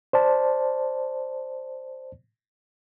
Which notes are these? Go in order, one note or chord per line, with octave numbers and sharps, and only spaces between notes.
C5 D5 A5